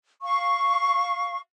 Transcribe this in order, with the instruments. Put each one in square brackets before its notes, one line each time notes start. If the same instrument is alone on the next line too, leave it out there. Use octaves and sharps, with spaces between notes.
[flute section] F5 C#6